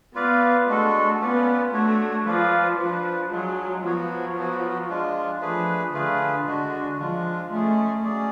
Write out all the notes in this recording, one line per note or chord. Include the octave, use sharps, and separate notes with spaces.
B3 F4 B4 D5 F5
G#3 A3 D4 F#4 A4
B3 C#4 F4 B4 D5
A3 D4 F#4 C#5
F3 F4 B4 D5 F5
F3 D4 F4 B4
F#3 G#3 D4 F4 G#4
F3 F#3 B3 F#4 C#5
F#3 B3 F#4
G#3 D4 F4
F3 A3 D4 G#4 B4
D3 A3 F4 G#4 B4
D3 G#3 D4 F#4
F3 G#3 D4 F4
G#3 A3 C#4 G#4
F#3 C#4 G#4 D5